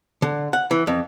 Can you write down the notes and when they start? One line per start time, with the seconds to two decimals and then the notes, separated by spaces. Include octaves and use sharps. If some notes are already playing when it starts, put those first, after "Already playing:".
0.22 D3
0.53 F#5
0.71 E3
0.87 F2